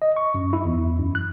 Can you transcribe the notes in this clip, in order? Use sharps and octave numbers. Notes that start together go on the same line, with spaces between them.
D#5
C#6
F#2
E4
E2
F#2
F#6